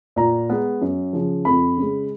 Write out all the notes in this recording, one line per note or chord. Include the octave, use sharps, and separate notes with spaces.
A#2 A#5
G#3 B3
F#2
C#3 F3
F2 B5
C#3 G#3